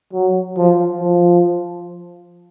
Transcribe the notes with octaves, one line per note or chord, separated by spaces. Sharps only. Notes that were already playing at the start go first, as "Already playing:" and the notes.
F#3
F3
F3